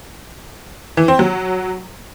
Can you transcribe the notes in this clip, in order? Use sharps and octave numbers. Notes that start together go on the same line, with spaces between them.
E3
C4
F#3